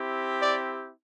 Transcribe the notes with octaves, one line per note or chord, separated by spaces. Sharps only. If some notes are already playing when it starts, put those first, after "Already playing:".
Already playing: C4 E4 G4
D5